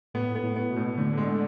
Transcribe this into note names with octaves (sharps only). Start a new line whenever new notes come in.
A2 B3
B3
A2
B3
B2
A2
A2 D3
G#3